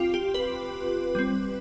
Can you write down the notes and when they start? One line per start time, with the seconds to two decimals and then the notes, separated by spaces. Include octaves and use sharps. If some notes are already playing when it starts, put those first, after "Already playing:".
Already playing: C4 F4 G4
0.14 G4
0.34 B4
1.15 G3 C4